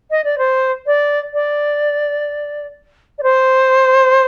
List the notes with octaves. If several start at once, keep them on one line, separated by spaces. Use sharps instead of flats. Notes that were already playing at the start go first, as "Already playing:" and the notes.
D#5
D5
C5
D5
D5
D5
C5